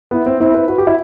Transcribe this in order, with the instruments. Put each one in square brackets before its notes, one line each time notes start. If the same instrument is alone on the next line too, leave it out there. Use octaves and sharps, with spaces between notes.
[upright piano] B3 [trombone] E4
[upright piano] C4
[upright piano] C4 [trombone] E4
[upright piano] B4
[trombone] F#4 [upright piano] B4
[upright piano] G4
E4